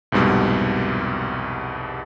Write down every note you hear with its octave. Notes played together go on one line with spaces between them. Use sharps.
C2 F2 G#2 B2 G3